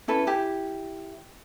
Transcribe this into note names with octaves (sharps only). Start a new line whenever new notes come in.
C#4 E4 A4 B4
E4 G4